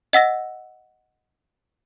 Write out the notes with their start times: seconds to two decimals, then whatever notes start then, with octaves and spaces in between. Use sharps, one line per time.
0.13 D#5 F#5 E6 A#6